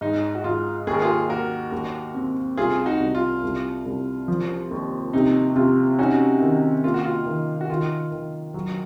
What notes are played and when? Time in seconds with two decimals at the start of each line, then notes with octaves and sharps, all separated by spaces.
0.01 G#2 D#4
0.35 F#4
0.44 G#2 F4
0.87 D#2 G#4
0.94 A#4
1.02 F4 G#4
1.29 A#3 F#4 A#4
1.72 D#2
2.15 C4
2.58 C2 F4 G#4
2.86 D#4 F#4
3.00 C2
3.15 F4
3.43 C2
3.86 C2
4.28 F3
4.71 D#2
5.13 C3 D#4
5.56 C3 F4
5.99 C#4 D#4 F#4
6.41 D#3
6.84 A#3 F4
6.94 F#4
7.04 F4
7.26 D#3
7.61 F#4
7.69 D#3 F4
8.11 D#3
8.54 F#3